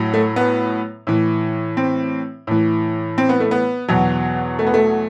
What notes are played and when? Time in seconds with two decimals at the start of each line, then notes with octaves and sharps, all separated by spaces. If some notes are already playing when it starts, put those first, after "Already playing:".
Already playing: A2 F#3
0.14 A3
0.36 B3
1.07 A2 E3
1.77 C4
2.47 A2 E3
3.18 C4
3.29 B3
3.40 A3
3.51 B3
3.88 E2 B2 F#3
4.59 A3
4.67 B3
4.74 A3